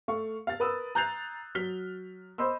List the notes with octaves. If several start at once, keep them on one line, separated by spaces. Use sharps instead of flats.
A3 F5 C#6
F5 A6
A#4 B4 D#6 E6
A#5 F#6 G6 A6 C7 F7
F#3 F6 B6 G7
C5 D#5 B5 C6 E6